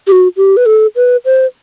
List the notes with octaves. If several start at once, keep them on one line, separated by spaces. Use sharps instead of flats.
G4
F#4
G4
B4
A4
B4
C5